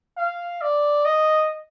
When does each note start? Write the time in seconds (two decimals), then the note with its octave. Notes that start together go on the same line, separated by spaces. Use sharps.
0.17 F5
0.61 D5
1.05 D#5